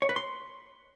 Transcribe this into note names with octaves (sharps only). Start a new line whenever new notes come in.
C#5
B4
C6